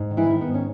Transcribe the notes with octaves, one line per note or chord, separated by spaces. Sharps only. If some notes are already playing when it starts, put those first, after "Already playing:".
Already playing: G#2
D#3
E3 E4
D#3
B3
G#2
C#4